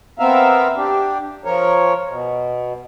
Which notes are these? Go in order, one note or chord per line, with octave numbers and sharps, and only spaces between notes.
B3 C4 A#4 E5 F5
D4 G4
F3 A#4 C#5
B2